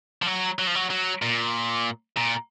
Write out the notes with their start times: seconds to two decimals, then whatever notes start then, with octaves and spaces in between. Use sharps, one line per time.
0.22 F3
0.27 F#3
0.59 F#3
0.67 F3
0.75 F#3
0.90 F#3
1.22 A#2
2.17 A#2